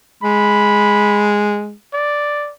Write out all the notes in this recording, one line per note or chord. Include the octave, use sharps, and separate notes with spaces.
G#3 B5
D5